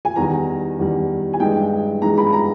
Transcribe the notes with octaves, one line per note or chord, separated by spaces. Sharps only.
G#5
E2 D#3 G3 A#5
E2 D#3 G3
G#5
G2 E3 G#3 D#4 G5
G2 E3 G#3 D#4 A#5
B5
A#5